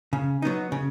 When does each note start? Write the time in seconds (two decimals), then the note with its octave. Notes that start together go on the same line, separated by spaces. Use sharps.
0.13 C#3
0.42 F#3 B3 D#4
0.72 C#3